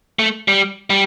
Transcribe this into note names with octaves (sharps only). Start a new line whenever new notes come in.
A3
G3
G3